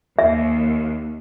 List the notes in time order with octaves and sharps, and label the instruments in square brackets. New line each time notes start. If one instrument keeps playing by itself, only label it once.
[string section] D#2 [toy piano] E5